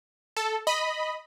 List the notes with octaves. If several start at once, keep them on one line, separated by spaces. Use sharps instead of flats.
A4
D#5 B5